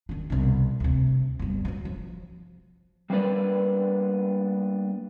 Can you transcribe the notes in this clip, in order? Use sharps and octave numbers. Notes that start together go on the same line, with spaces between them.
D#3 D4
C2 B2
D2 C3
G1 G2
E3 F#3
F3
G3 A#3 B3 D4 B4 D5